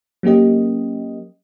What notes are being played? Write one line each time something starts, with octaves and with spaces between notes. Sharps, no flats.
F#3 A#3 C#4 G4 D#5